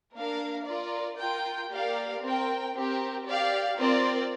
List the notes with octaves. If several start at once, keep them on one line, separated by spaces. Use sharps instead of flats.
A#3 D4 A#4 F5
F4 A#4 D5
F4 A#4 G5
A#3 G4 A#4 D5 F5
C4 A#4 G5
C4 G4 A#4
G4 D5 F5
C4 F4 A#4 D5